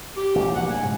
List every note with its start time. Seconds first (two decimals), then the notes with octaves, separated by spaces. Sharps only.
0.17 G4
0.35 A1 F#3
0.55 A#1 A#3 F#5
0.70 G#5
0.82 G#2 C#3